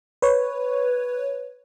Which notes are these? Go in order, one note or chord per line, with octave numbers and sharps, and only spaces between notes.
B4 C#5